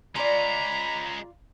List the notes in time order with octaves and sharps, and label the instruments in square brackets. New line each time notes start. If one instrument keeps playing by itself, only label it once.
[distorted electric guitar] G#3 C#4 [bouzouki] F4 D5 [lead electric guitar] A#5 [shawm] B5